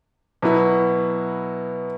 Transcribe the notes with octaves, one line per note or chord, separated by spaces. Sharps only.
B2 F#3 B3 E4